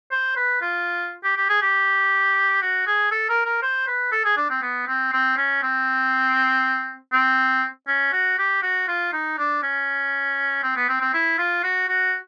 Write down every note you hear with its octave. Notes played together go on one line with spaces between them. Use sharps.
C5
B4
F4
G4
G4
G#4
G4
F#4
G#4
A4
A#4
A#4
C5
B4
A4
G#4
D4
C4
B3
C4
C4
C#4
C4
C4
C#4
F#4
G4
F#4
F4
D#4
D4
C#4
C4
B3
C4
C4
E4
F4
F#4
F#4